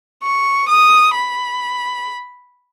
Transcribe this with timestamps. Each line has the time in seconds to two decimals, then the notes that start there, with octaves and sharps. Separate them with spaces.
0.23 C#6
0.69 D#6
1.15 B5